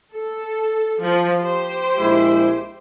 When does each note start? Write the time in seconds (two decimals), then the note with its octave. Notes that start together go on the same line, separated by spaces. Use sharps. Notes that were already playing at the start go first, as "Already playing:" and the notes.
0.13 A4
1.02 F3
1.41 G4 C5
1.99 A#1 G#3 E4